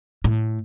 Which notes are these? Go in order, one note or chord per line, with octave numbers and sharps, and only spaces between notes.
A2